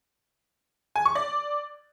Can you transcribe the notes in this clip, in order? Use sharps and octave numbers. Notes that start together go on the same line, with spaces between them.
G#5
C#6
D5